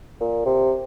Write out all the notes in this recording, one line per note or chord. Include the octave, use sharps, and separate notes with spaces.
A#2
C3